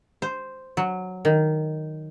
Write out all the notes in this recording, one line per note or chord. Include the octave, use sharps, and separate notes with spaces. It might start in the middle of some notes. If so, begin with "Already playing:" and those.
C5
F#3
D#3